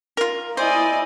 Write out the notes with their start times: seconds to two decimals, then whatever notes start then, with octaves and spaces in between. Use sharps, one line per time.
0.17 F4 A#4
0.57 E4 C5 D5 D#5 G#5